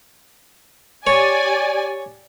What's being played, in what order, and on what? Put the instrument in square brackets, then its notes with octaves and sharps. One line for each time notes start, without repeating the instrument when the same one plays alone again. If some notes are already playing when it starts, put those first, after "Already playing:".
[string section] G4 D5 G#5 [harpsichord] C#5